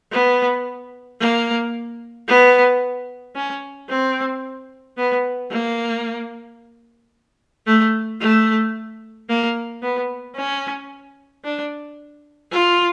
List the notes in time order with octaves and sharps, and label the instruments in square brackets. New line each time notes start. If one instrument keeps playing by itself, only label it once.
[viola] B3
A#3
B3
C#4
C4
B3
A#3
A3
A3
A#3
B3
C#4
D4
F4